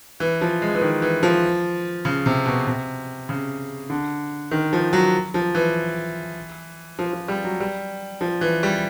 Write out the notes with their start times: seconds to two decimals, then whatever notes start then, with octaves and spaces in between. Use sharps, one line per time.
0.20 E3
0.41 F3
0.62 G#3
0.75 E3
0.81 D#3
1.02 E3
1.23 F3
2.05 C#3
2.26 C3
2.46 B2
2.67 C3
3.29 C#3
3.90 D3
4.51 D#3
4.73 F3
4.93 F#3
5.34 F3
5.55 E3
6.99 F3
7.13 F3
7.28 G3
7.44 F#3
7.60 G3
8.21 F3
8.41 E3
8.63 G3